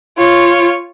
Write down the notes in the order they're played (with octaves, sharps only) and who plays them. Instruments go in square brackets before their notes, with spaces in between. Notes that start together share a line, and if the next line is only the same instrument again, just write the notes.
[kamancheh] F4 C#5